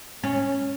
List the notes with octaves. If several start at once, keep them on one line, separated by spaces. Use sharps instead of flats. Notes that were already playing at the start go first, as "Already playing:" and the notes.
C#4